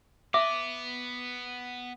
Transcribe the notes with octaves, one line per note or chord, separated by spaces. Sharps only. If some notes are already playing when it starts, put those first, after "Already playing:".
B3 E5 D6